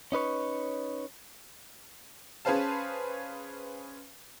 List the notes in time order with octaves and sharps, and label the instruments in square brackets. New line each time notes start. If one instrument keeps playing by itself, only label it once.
[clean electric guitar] C#4 D#4 B4 C#5
[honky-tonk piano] C#4 G#4 B4 C5 F5 A5